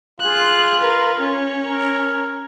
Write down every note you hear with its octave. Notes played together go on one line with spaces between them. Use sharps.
F4 G#4 F#6
A#4 B4
C#4 C#5
A#4